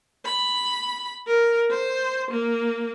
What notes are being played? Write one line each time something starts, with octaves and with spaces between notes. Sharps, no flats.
B5
A#4
C5
A#3